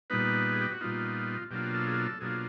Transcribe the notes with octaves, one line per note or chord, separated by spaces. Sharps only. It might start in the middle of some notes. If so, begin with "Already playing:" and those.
A#2 G3 B3 D#4 B4
G#4
G4
F#4
A#2 G3 B3 D#4 F4
B2 F#3 A#3 D4 F4 G4
A4
G#4
A4
B2 F#3 A#3 D4 F4 G#4